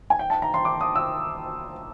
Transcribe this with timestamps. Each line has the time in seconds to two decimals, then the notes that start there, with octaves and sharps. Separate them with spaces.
0.10 G#5
0.19 G5
0.30 A5
0.42 A#5
0.54 C6
0.65 D6
0.81 D#6
0.96 E6